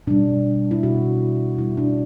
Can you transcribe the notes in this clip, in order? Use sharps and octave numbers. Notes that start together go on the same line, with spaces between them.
B2 G3 D4
E4
B2 G3 F#4
B2 G3 E4
D4